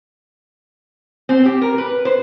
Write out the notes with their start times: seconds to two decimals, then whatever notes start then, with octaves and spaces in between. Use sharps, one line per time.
1.29 C4
1.45 G4
1.62 A#4
1.78 B4
2.05 C5